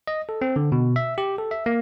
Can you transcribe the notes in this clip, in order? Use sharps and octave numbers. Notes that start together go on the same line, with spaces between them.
D#5
A4
C4
D3
B2
E5
G4
A4
E5
A#3